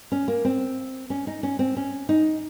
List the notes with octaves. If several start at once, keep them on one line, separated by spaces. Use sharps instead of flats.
C#4
A#3
C4
C#4
D#4
C#4
C4
C#4
D#4